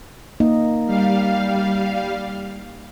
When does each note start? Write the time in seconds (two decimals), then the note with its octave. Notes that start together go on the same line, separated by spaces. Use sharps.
0.40 A#3 D#4 D#5
0.86 G3 F5